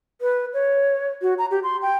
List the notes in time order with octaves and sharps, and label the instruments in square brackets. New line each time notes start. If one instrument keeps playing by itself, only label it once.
[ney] B4
C#5
F#4
A#5
G4
C6
G5